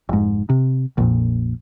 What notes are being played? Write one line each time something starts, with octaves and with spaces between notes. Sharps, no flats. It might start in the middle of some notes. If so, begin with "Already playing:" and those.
F1 G#2
C3
A#1 F2 A#2